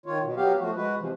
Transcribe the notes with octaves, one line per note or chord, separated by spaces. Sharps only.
D#3 F4 C#5
B2
F#3 B3 G4 F5
F3 A3 F#4
G#3 F#4 B4
C3 E3 F3